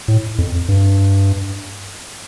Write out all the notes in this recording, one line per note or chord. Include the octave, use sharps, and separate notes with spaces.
A2
F2
G2